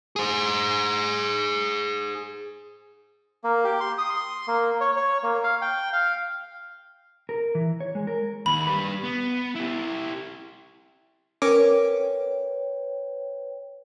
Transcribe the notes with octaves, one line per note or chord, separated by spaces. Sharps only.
G#4 C5
A#3
G4
C6
D#6
C6
A#3
C#5
C#5
A#3
F5
G5
F5
A#4
E3
C#5
G#3
A#4
D#2 B5
G3 B4
B3
E4 G4
C#4 A#4 B4 C#5 G5 D6